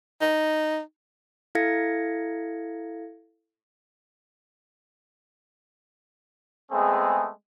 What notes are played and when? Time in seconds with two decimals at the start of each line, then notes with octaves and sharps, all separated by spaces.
0.21 D#4
1.55 E4 A4 F5 G#6 A#6 C#7
6.71 G#3 A3 B3 C4 G#4